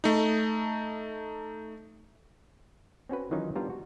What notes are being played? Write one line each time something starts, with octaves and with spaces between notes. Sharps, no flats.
A3 D#4
C4 C#4 F#4 B4
D#3 E3 F#3 C#4 D#4 F4
G3 B3 D4 F4 A#5
F#4